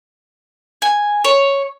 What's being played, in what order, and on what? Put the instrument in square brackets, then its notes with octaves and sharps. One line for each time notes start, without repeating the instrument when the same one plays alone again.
[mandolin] G#5
C#5